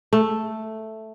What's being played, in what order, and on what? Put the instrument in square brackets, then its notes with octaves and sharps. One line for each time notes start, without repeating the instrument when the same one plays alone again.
[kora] A3